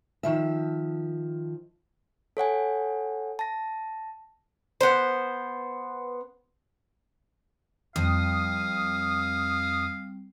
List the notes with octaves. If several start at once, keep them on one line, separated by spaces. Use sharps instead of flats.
D#3 F3 E5
A4 C#5 F#5 G#5
A5 A#6
B3 C5
F2 G3 C4 F5 D#6